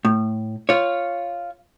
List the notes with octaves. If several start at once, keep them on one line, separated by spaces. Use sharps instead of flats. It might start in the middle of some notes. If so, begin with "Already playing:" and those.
A2
F4 C#5